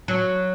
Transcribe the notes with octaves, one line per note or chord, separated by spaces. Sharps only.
F#3